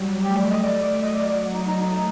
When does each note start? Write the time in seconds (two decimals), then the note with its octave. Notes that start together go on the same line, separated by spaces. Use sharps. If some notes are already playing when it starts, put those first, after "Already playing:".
Already playing: F#3 G3
0.24 A3 G4
0.37 D5
0.50 D#5
0.62 A3 D5
0.83 D5
1.02 F#3 D#5
1.15 D5
1.28 D5
1.54 D#4
1.67 D#4
1.80 A3 D#4